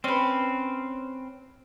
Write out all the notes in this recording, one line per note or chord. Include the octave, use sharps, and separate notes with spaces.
C4 C#4 B4